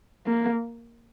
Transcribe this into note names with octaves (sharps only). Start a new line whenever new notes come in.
A#3